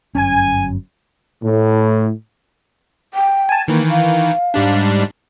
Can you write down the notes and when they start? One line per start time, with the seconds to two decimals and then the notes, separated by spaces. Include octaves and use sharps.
0.15 G1 F#2 C#4 G#5
1.43 A2
3.14 G5
3.49 G#5 A5
3.68 D#3 E3 A#3
3.90 F5
4.54 G#2 G3 D4